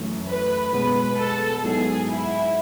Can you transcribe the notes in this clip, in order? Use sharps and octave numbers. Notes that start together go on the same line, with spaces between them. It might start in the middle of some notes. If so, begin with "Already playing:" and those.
Already playing: F#2 E3 A3
B4
B2 G#3 B3 F#4 B4
A4
G#2 F#3 B3 E4 G#4
E4